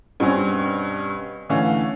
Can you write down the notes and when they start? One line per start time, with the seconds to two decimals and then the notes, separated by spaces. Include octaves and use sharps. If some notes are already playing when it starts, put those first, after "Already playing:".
0.20 G2 B2 C4 C#4
1.49 D3 E3 A3 C#4 F5